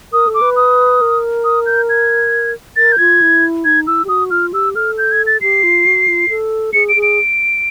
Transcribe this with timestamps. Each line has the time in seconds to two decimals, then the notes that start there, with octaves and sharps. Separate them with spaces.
0.12 A#4 D#6
0.27 A4
0.34 D6
0.41 B4
0.56 D#6
1.01 A#4
1.44 D#6
1.66 G6
1.89 G#6
2.76 A#4 A6
2.92 G6
2.98 F4 G#6
3.22 E4
3.65 D#4 G#6
3.87 E4 E6
4.04 G4
4.09 F#4 D#6
4.31 F4 F6
4.53 G4 E6
4.75 A4 F6
4.98 G6
5.12 G#6
5.27 A6
5.41 G4 C7
5.63 F4
5.86 F#4
6.08 F4
6.29 A4
6.73 G#4 C#7
6.89 D7
6.96 G#4
7.03 D7